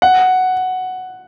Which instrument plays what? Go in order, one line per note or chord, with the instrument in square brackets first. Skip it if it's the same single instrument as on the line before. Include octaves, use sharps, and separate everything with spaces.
[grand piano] F#5